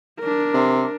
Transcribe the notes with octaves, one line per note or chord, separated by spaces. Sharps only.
D4 A#4
C3